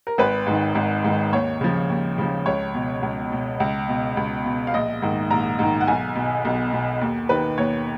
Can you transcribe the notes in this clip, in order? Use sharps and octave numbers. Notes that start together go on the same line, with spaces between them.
A#4
G#1 B4
G#2 D#3
G#1
G#2 D#3
D#2 C#5
C#3 F3
D#2
C#3 F3
C#2 C#5
B2
C#2
B2
C#2
B2
C#2
B2
F5
A#1 D#5
G#2 D#3
A#1 A#5
G#2 D#3
F#5
B1 G#5
B2
B1
B2
D#2
D#3 B4
D#2 C#5